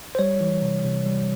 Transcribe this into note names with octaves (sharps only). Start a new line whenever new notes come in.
C5
G3 C#5
E3
C3
C3
G3